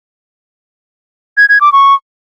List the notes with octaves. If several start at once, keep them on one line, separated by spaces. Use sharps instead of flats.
G#6
G#6
D6
C#6